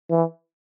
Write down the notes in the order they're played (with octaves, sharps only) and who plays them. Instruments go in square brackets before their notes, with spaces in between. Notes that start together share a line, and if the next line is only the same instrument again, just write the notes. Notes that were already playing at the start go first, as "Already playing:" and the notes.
[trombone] E3